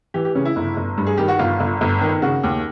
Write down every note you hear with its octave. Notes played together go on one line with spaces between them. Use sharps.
E3 G4
G4
C#3 C#4
E4
G1
G1
G2
G#4
D#3 G4
F#4
G1 F4
G1
G1
D#3
C#3 F#4
D#2